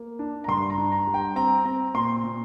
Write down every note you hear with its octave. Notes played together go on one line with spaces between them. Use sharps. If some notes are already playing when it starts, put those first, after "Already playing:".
Already playing: A#3
D4
A#5
G2 C6
A#5
D4
A#5
G3
G5
C4 A#5
C4 A#5
A#2 C6
A#2